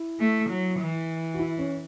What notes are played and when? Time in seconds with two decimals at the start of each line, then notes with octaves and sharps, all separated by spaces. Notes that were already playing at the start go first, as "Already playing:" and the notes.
Already playing: E4
0.20 A3
0.50 F#3
0.80 E3
1.34 F#4
1.39 E4
1.59 C#4